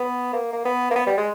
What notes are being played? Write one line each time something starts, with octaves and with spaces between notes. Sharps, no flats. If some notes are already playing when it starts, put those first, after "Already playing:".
Already playing: B3
A#3
A#3
B3
A#3
B3
G3
G#3